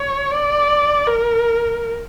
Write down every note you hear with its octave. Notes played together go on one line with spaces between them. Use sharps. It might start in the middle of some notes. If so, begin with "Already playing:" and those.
Already playing: C#5
D5
A#4